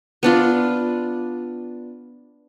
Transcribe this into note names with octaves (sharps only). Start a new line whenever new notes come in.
B3 D4 F4